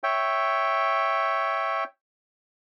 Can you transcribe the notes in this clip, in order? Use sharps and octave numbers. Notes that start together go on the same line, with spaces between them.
C#5 E5 G5